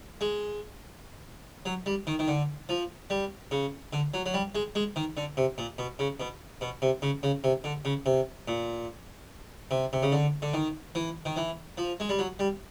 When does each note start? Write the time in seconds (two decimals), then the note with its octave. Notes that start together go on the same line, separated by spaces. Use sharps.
0.21 G#3
1.66 F#3
1.86 G3
2.07 D#3
2.19 D#3
2.28 D3
2.69 F3
3.10 G3
3.51 C#3
3.93 D3
4.14 F#3
4.26 F#3
4.34 G3
4.55 G#3
4.75 G#3
4.96 D#3
5.17 D3
5.37 C3
5.58 A#2
5.78 B2
5.99 C#3
6.20 B2
6.61 B2
6.82 C3
7.02 C#3
7.23 C#3
7.44 C3
7.64 D3
7.85 C#3
8.06 C3
8.48 A#2
9.71 C3
9.93 C3
10.03 C#3
10.12 D3
10.42 D3
10.54 D#3
10.95 E3
11.25 D#3
11.36 E3
11.77 F3
12.00 G#3
12.09 G3
12.19 F#3
12.39 G3